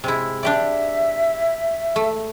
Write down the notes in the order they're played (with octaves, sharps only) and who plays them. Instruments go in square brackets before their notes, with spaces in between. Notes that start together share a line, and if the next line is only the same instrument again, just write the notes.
[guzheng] C3 G#3 E4
[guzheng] D4 G4 D5 [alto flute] E5
[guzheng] A3